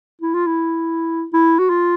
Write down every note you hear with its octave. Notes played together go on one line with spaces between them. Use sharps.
E4
F4
E4
E4
F#4
F4